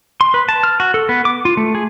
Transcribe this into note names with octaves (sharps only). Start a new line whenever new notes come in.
C6
B4
A5
F6
F#4
A4
B3
D6
F4
A3
G#4